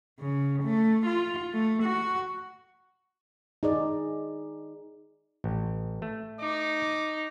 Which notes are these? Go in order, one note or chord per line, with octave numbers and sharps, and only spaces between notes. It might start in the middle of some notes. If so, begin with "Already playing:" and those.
C#3
A3
F4
A3
F#4
D#4 G#4 D5
A1
A3
D#4 D6